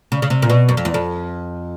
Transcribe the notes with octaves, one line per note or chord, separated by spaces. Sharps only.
C#3
C#3
C3
A#2
B2
F#2
F2
E2
F2